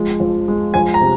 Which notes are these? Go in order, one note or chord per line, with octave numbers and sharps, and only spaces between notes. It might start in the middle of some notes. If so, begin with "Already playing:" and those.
Already playing: F3 G#3
F2
G#3
F2 G#5
A#5
C3